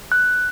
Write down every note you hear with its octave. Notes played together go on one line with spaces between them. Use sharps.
F#6